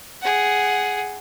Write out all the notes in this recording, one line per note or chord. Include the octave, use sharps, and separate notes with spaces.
G#4 F#5